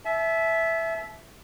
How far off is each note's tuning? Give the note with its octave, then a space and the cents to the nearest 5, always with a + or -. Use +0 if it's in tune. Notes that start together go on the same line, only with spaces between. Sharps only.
E5 +0 A5 -45